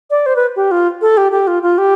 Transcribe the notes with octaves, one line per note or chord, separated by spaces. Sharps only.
D5
C5
B4
G4
F4
A4
G4
G4
F4
F4
G4